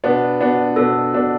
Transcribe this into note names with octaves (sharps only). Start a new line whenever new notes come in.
B2 B3 D4 B4
B2 B3 D4
B2 B3 D4 A4
B2 B3 D4